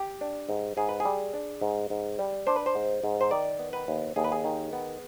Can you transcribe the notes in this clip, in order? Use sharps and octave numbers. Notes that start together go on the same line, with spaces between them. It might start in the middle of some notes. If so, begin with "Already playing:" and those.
Already playing: G4
D4
G#2
G#2 G#4
B4
G#4
G3
D4
G#2
G#2
G3
D4 C5
B4
C5
G#2
G#2
C5
D#3 D5
B3
B4
D#2
D#2 G#4
B4
G#4
D#3
B3